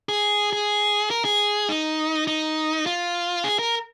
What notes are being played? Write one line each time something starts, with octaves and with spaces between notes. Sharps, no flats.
G#4
G#4
A#4
G#4
D#4
D#4
F4
G#4
A#4